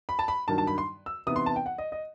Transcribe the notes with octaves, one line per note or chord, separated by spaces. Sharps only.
B5
A5
B5
G2 D#3 F#3 A5
A5
B5
C6
E6
C3 E3 B3 D#4 D#6
C6
A5
G5
F#5
D#5
D#5